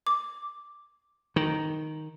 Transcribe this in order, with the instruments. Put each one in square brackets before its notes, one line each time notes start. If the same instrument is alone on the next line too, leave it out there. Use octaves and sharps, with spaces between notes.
[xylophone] D6
[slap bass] D#3